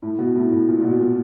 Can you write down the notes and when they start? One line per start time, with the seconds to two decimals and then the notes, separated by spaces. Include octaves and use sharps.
0.02 A2
0.19 B2
0.35 A2
0.51 A2
0.68 A#2
0.80 A#2
0.84 B2
1.00 A#2